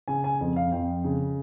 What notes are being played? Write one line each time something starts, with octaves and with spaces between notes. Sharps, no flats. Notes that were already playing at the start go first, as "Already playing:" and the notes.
C#3 G#5
G#5
F2
F5
F2 G5
C#3